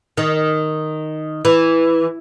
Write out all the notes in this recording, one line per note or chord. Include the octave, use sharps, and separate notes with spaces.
D#3
E3